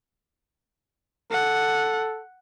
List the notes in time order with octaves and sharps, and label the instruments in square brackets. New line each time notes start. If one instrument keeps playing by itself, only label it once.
[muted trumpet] A4 [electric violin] F#5